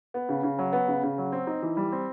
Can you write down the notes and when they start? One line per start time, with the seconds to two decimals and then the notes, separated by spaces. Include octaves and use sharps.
0.14 B3
0.29 C#3
0.43 C#3
0.59 F#3
0.73 B3
0.88 C#3
1.03 C#3
1.18 F#3
1.32 C4
1.47 D#4
1.62 E3
1.77 G3
1.92 C4